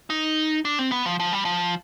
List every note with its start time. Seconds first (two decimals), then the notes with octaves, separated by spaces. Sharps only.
0.10 D#4
0.65 D4
0.79 C4
0.92 B3
1.06 F3
1.20 F3
1.32 G3
1.45 F3